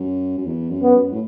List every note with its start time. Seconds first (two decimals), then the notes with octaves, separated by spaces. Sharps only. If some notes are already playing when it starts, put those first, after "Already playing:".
Already playing: F#2
0.38 F#2
0.46 E2
0.70 F#2
0.83 B3
0.95 F#2
1.12 A2